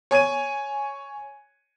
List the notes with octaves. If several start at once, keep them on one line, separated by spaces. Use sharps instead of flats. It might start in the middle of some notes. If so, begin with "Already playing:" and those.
C#5 G#5 G#6 D#7